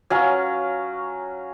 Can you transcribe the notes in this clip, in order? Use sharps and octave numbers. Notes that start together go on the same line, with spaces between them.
F#3 C#4 F5